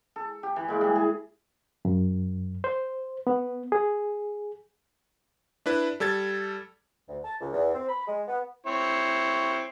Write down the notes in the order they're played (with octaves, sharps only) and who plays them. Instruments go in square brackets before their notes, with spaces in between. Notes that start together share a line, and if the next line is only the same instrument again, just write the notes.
[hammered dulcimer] A4
G4
E3
A#2 G#3
E3 G3
G#4
[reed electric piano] F#2
C5
B3
G#4
[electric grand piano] D4 E4 B4
G3 A4 G#6 A6
[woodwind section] D2
A5
C#2
E2
C4
B5
G#3
B3
[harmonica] C4 E4 C#5